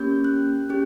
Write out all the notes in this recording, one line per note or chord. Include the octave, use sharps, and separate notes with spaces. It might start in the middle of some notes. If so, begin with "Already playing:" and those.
Already playing: A#3 C#4 G4 G6
F#6
C#4 G4